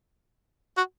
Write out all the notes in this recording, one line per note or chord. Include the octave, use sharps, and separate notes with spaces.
F#4